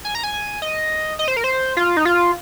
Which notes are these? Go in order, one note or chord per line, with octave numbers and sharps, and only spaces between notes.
G#5
A#5
G#5
D#5
D#5
C5
A#4
C5
F4
D#4
F4